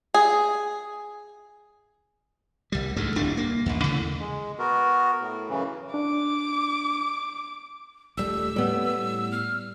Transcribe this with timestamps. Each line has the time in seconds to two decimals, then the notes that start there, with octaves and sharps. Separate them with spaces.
0.14 G#4
2.72 C2 G3
2.96 D2 G#2 G#3 A3
3.16 D1 C2 G3 D4
3.37 A#3
3.66 A1 D#2
3.84 C#3 E3 A3
4.20 G#3
4.59 B3 F#4 A#4
5.20 A2
5.49 F#2 C#3 E3
5.94 D4 D6
8.17 D#1 G3 A3 E6
8.56 A2 G3 B3
9.32 F6